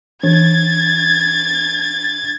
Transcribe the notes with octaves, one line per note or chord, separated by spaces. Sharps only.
E3 D4 G#6 A6